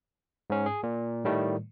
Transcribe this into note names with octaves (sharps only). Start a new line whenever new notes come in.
G#2 C#4
G#4
A#2
A2 D#3 G3 A3